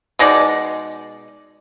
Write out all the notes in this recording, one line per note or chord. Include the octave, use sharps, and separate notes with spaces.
B2 G#3 D#4 D5